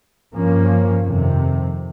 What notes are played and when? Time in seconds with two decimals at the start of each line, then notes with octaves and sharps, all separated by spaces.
0.34 G2 F3 A#3 C#4
1.04 F2 C3 D#3